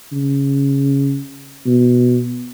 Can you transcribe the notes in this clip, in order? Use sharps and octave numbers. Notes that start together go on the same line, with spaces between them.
C#3
B2